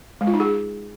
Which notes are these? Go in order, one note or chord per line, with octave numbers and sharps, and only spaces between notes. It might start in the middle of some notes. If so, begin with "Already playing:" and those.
G#3
F4
D#4
G#4